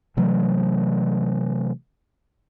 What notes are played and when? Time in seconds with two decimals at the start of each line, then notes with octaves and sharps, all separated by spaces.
0.17 C3 E3 F#3 A3